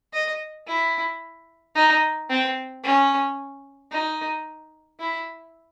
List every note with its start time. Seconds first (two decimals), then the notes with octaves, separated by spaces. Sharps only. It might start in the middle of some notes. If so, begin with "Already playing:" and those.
0.13 D#5
0.67 E4
1.75 D#4
2.30 C4
2.83 C#4
3.91 D#4
5.00 E4